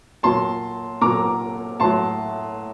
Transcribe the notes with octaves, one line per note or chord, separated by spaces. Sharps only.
A#2 F#3 A5 C6
A#2 F#3 A#5 D6
A2 F#3 A5 C6